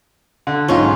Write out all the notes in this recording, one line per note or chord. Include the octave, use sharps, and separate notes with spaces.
D3
B1 G#2 C#4 F4 C#6